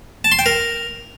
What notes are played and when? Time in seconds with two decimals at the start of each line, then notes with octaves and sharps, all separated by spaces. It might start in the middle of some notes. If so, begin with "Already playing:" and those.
0.24 A5
0.32 C6
0.39 G5
0.46 A#4